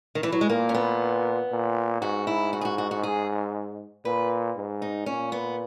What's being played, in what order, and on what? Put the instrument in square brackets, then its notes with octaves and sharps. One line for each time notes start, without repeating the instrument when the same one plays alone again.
[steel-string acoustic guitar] D#3
E3
F#3
G#3
[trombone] A#2 [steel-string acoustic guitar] A#3
[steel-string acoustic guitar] C#4
B3
[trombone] A#2
[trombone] G#2 [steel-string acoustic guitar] F#4
[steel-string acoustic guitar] E4
F#4
G#4
F#4
F#4
F#4
G#4
[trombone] A#2 [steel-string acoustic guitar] B4
[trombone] G#2
[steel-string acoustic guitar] D#4
[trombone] A#2 [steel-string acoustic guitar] C#4
[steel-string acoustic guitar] B3